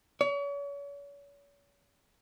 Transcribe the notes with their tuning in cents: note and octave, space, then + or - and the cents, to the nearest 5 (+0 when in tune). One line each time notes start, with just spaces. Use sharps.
C#5 +40